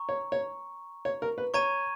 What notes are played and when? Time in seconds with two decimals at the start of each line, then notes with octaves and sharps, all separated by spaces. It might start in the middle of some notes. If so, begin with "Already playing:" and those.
Already playing: A#5 C#6
0.09 C#5
0.32 C#5
1.05 C#5
1.22 A#4
1.38 B4
1.54 C#5 A#5 C#6 G#6 D#7